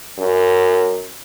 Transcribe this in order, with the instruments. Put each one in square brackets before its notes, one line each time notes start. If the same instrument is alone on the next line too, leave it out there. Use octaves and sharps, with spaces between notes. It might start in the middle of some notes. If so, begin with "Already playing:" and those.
[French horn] F#2